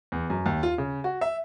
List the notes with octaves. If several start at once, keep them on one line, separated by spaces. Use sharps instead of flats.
E2
F#2
D#2
F4
C#3
F#4
E5